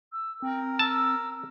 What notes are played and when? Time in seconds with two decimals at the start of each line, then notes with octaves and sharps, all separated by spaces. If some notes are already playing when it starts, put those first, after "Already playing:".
0.12 E6
0.42 C4 A#4 G5
0.79 A5 E6